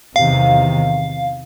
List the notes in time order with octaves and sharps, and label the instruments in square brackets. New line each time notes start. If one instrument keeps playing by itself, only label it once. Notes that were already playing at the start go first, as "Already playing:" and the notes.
[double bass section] E2 C3 D#3 [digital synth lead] F5